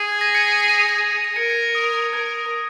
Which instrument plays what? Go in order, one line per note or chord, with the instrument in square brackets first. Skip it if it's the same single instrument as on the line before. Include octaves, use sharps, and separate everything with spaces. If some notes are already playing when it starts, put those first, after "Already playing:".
Already playing: [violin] G#4
[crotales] G#6
A#6
G#6 C#7
G#6 C#7
A#6
G#6 C#7
A#6 D#7
C#7 F7
A#6 D#7
G#6 C#7
A#6
A#6 D#7
[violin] A#4 [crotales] G#6 C#7
[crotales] G#6 C#7
A#6
D#6
[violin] A#4 [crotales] G#6